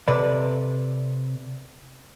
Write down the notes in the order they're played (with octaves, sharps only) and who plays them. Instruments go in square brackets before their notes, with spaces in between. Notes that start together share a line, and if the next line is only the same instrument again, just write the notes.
[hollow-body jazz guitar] C3 A4 B4 D5 B5